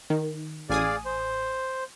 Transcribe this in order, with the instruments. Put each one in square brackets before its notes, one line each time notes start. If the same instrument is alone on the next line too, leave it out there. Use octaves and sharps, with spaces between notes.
[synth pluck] D#3
[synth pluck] A1 G#5 D#6 [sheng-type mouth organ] G#4 D5 F5
[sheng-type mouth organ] C5